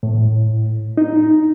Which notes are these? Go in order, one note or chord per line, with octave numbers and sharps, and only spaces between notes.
A2
D#4